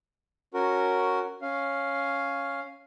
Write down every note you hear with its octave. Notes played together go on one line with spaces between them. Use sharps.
C#4 F#4 A#4
C#4 F5